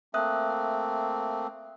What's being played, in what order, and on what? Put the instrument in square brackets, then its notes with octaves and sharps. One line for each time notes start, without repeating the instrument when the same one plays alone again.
[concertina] A3 A#3 C4 [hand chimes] E5 D#6 F#6